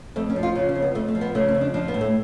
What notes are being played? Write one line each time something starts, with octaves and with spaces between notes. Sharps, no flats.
F2 A3
C#4
F3
F4
C#3
C#4
F2
B3
F2 A3
A3
F3
B3
C#3 A3
C#4
F2
D4
F3 D4
B3
A2
A3